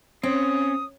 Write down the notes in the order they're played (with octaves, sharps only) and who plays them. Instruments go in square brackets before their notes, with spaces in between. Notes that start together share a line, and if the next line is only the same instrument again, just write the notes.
[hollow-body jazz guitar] C4 [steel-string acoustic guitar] C#4 [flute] D#6